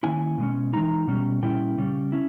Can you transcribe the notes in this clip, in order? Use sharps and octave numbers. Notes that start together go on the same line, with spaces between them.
D#3 A#3 C#4 E4 G#5
B2 G#3 C#4
E3 G#3 D#4 A#5
B2 G3 C#4
A#2 G3 C#4 E4 G5
C#3 G3 C#4
C#4 E4